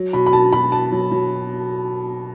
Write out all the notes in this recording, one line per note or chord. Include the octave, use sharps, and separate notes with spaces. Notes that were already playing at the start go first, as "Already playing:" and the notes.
Already playing: F#3
B2 B5
B5
B2 A5
B2 B5
B2 A5
F#3
F#3